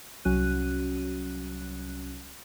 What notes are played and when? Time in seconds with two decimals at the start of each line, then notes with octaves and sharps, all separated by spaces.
0.25 C2 F#3 C#4 F#4 F#6 D#7